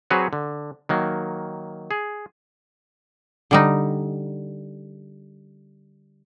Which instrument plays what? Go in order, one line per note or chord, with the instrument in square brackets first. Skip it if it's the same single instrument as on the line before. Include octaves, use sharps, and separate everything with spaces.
[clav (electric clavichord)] F#3 C4 F#4 G#4 B4 C#5
D3
D#3 F#3 A#3
G#4
[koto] D3 G3 D#4